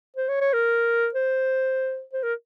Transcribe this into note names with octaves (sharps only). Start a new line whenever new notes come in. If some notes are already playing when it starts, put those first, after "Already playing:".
C5
C#5
C#5
A#4
C5
C5
A#4